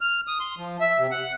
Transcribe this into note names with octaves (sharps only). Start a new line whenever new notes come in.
F6
D#6
C6
F3
E5
C3
F#5